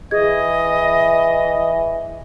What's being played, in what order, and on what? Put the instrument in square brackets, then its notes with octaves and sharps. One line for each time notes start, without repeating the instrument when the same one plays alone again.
[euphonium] E3 [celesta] G#4 G#6 [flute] D#5